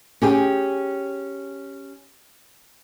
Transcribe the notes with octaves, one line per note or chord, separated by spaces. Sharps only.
C#4 G4 G#4 G5